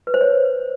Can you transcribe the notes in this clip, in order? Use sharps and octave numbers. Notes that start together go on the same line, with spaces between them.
B4
C5
C#5